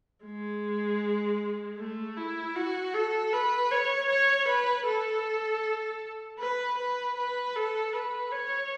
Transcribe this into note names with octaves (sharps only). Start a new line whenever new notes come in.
G#3
A3
E4
F#4
A4
B4
C#5
C#5
B4
A4
B4
B4
B4
A4
B4
C#5